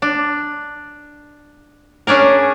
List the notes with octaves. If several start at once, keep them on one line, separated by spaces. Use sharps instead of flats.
D4
C#4 D4 G#4 A#4